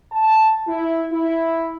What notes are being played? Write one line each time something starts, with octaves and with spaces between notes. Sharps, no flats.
A5
E4
E4